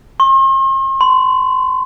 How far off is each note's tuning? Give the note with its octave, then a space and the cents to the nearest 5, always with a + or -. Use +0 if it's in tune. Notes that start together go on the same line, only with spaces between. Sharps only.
C6 +45
C6 -40